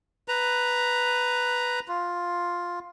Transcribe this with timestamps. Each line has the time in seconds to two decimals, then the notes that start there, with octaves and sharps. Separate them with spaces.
0.28 B4 A#5
1.88 F4